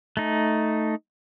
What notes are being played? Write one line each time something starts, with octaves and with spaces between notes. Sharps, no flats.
A3 D#4